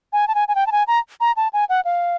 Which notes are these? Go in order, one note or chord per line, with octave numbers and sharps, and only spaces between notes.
G#5
A5
G#5
G#5
G5
A5
G#5
A#5
A#5
A5
G#5
F#5
F5